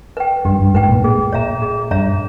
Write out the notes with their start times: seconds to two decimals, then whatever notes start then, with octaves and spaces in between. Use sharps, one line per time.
0.17 B4 G5
0.45 G2 G4
0.59 G2
0.74 G#2 B4 G5
0.89 A#2
1.03 A#2 G#4
1.33 A#2 C#5 E5 A#5
1.62 G#4
1.91 G2 C#5 E5 A#5